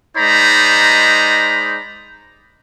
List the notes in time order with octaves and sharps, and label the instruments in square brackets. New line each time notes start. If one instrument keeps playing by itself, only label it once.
[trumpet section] G#3 D#4 C5 D5 A#5 B5